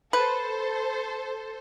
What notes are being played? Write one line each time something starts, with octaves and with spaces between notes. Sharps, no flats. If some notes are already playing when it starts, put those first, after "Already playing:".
A4 B4 C5